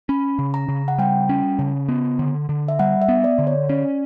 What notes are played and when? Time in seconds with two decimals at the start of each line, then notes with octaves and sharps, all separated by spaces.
0.09 C#4 B5
0.39 C#3
0.54 A#5
0.68 C#3
0.88 F#5
0.98 G3 G5
1.29 C#4
1.59 C#3
1.88 B3
2.19 D3
2.49 D3
2.68 E5
2.79 G3 F#5
3.02 E5
3.09 B3
3.24 D5
3.39 D3
3.47 C#5
3.69 C#4 D5